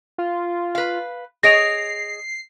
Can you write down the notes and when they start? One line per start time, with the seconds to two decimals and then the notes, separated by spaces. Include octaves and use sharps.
0.18 F4
0.75 B4 F5
1.43 G#4 C#5 D#5 A#6 C7 D7 F7